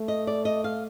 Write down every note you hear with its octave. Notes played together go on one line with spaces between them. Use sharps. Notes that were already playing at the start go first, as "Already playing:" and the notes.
Already playing: A3
D#5
D5
D#5
F5